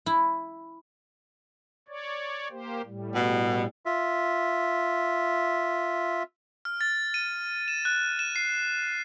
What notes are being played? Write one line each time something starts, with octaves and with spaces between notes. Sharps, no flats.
E4
C#5 D5
A#3 G4 C5
A2 G3
B2
F4 E5
F6
A6
D#7
E7
F#6
E7
C7